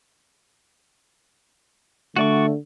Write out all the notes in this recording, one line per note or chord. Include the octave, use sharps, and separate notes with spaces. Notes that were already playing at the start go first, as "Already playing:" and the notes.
D3 A3 F#4 D5 C#6